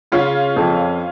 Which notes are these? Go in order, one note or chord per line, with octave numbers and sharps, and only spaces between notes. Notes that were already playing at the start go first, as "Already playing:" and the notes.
C#3 C#4 F4
F2